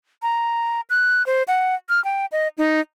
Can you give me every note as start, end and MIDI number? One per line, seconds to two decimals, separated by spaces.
0.22 0.81 82
0.90 1.25 90
1.26 1.43 72
1.48 1.75 78
1.89 2.03 89
2.04 2.26 79
2.32 2.48 75
2.58 2.80 63